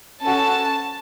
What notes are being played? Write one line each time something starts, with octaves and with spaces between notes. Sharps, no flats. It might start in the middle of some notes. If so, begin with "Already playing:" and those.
C#4 F#4 A4 A5